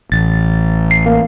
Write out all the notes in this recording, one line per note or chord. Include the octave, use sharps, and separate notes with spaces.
A1 A6
C7
A#3